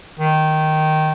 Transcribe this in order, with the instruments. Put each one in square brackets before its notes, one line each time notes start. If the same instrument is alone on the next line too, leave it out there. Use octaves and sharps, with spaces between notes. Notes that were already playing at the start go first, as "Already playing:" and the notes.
[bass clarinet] D#3